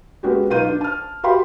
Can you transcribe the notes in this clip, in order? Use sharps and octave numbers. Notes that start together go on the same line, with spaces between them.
G#3 B3 C#4 F#4 G4
B1 D#4 F4 B4 G6 D#7
D4
A5 F6
F#4 G4 F5 G5 B5 C6